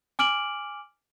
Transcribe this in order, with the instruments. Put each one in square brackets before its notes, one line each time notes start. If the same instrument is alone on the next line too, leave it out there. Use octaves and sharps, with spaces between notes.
[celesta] G#5 D6 F6 D7 F#7